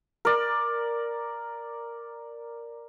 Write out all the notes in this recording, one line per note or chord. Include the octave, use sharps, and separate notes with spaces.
A#4 D5